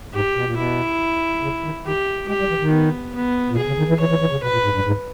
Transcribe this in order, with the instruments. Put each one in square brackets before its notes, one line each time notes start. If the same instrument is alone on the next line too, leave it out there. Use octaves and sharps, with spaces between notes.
[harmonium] G#2 [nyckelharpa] G4
[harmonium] B2
A#2
[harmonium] B2 [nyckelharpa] E4
[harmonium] C#3
D#3
[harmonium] D#3 [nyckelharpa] G4
[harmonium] G#3 [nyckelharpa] G4
[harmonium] G3
E3
D#3
[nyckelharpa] B3
B3
[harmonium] A#2
[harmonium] B2 [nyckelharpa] G#4
[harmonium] C#3
D#3
E3
[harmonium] E3 [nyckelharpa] C#5
[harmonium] E3
E3
C#3
[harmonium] B2 [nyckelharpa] B4
[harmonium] A#2
G#2
G2
G#2